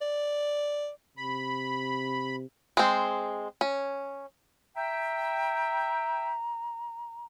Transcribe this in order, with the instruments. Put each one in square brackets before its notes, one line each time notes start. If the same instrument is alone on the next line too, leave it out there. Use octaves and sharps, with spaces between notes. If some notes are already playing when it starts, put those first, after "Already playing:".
[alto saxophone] D5
[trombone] C3 [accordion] B5
[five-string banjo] G#3 C4
C#4
[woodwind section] E5 G5 [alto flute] A#5